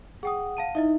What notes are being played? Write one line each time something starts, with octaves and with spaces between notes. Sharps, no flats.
G#4 F#5 G5 D#6
F5 A5 D#7
D#4 E4 D#5 E5